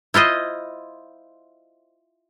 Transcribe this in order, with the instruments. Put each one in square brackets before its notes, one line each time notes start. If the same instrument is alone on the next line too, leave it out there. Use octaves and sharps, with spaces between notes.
[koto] E4 F4 C5 D#5